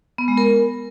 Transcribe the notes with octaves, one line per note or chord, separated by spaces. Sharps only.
B3
G#3
A#4